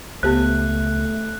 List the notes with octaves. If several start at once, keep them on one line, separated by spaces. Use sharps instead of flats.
C#2 A3 B3 G4 C5 F#6